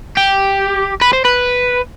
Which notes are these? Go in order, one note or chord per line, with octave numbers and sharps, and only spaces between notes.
G4
B4
C5
B4